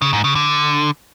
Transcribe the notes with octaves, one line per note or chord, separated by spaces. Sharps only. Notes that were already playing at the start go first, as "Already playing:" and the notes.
C#3
G#2
C#3
D3